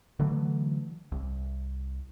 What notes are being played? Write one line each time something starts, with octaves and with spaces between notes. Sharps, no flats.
D3 E3 F#3 A3
C2